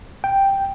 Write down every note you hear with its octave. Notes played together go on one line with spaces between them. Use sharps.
G5